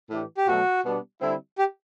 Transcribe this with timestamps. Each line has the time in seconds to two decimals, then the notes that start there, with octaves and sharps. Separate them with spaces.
0.10 A2 E3 A3 D4 G4
0.37 G4
0.47 B2 F#3 A3 F#4
0.84 B2 G3 B3 D4
1.21 D3 G3 C4 E4
1.58 G4